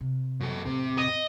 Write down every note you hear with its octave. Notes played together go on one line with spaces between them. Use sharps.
C3
F#2 A4
E2 A2 C3
D#5